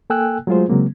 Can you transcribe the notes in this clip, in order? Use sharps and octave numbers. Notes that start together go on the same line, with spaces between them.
A#3 A4 G5 G#5 E6 F#6
F#3 G#3 A3 F4 G#4 C5
C#3 F#3 G#3 A#3 C4